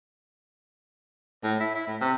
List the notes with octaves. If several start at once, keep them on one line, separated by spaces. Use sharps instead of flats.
A2
E4
E4
A2
C3